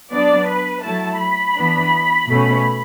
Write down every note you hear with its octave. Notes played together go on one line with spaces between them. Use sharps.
F#3 B3 D4 D5
B4
F#3 A3 E4 A5
B5
E3 B3 D4
B2 A3 C#4